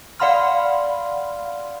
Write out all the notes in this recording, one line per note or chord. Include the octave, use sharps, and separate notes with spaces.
D5 F5 F#5 B5 C6 F6